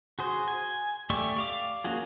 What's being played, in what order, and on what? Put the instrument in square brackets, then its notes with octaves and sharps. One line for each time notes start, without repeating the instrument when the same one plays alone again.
[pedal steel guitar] F#4 G#4 C5
G#5
A3 G4 D5 E5 C#6
D5 F5 D6
A#3 C#4 F4 F#4 G#4